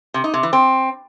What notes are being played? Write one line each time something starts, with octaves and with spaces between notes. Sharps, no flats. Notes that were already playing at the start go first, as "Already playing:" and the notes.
C3
D#4
C3
E3
C4